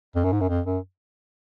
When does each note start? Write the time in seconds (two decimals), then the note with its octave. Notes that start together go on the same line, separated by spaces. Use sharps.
0.16 F2
0.24 F#2
0.32 G#2
0.40 F#2
0.49 F2
0.66 F#2